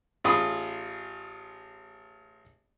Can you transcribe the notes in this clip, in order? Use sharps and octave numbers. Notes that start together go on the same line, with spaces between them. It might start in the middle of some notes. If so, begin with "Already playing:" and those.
A1 F4 G#4 B5 D#6